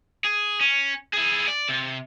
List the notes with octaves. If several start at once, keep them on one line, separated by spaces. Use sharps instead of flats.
G#4
C#4
E4 G#4
D5
C3